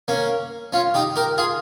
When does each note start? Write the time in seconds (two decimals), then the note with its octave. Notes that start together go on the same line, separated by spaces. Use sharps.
0.08 A#3 C#4
0.72 C#4 F4
0.94 D#4 G4
1.16 G4 A#4
1.38 F4 G#4